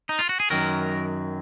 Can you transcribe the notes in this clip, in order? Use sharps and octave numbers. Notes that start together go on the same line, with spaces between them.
D#4
F4
F#4
G#4
F#2 D#3 F#3 A#4